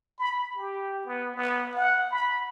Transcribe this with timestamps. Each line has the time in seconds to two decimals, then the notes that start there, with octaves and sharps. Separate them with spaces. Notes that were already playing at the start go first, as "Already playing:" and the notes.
0.19 B5
0.57 G4
1.06 B3
1.35 B3
1.75 F#5
2.10 B5